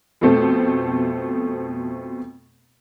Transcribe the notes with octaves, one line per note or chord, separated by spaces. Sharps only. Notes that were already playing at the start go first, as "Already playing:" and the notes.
F2 B2 A3 C4